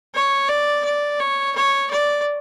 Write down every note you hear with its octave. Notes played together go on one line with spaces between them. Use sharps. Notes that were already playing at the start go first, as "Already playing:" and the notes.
C#5
D5
D5
C#5
C#5
D5